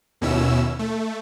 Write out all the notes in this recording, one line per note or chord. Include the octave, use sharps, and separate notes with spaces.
D#2 B2 C#4 E4 E6
A3